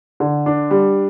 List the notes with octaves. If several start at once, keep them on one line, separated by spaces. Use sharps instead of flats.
D3
D4
G3